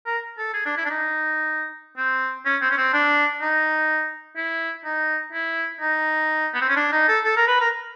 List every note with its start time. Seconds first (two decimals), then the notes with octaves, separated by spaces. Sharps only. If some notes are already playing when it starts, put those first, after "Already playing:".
0.06 A#4
0.38 A4
0.53 G#4
0.65 D4
0.77 E4
0.85 D4
0.90 D#4
1.97 C4
2.45 C#4
2.61 C4
2.71 C#4
2.77 C4
2.93 D4
3.41 D#4
4.36 E4
4.84 D#4
5.32 E4
5.80 D#4
6.54 B3
6.61 C4
6.69 C#4
6.76 D4
6.92 D#4
7.08 A4
7.24 A4
7.36 A#4
7.48 B4
7.60 A#4